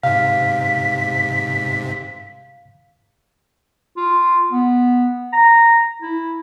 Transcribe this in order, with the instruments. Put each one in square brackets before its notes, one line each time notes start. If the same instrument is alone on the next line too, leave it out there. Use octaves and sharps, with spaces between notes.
[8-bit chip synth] G#2 C3 [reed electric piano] F5 [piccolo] B6
[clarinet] F4
B3
A#5
E4